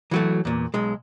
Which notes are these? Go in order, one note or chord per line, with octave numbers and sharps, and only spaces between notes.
E3 F#3 A3
E2 A#2
B1 G#3